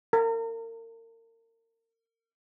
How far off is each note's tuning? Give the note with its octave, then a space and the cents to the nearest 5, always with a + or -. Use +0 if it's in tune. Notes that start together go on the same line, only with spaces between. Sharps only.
A#4 -35